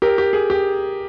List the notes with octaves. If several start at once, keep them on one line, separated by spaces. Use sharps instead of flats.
G4 A#4
G4
G#4
G4